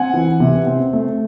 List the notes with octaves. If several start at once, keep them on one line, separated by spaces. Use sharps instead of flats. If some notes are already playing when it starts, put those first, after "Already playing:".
Already playing: C4 F#5 G#5
E3
C3
C4
A3